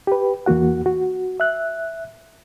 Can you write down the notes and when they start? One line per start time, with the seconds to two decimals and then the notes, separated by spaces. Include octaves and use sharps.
0.07 G4 B4
0.46 E2 E3 A#3 F#4 F#5
0.86 F#4
1.40 E5 F#6